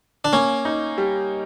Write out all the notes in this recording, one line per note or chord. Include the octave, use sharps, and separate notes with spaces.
D4
A#3 C#4
D#4
G3